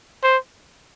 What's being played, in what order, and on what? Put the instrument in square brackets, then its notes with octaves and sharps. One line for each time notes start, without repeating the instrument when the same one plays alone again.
[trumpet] C5